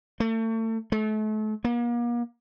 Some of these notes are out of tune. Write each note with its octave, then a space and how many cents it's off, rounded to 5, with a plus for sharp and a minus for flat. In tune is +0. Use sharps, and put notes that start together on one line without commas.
A3 +35
A3 -35
A#3 +40